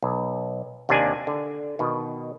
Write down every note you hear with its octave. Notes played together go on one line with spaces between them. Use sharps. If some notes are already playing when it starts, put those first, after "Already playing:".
B1
D#2 C3 A#3 D4 G#5
D3
B2 D#3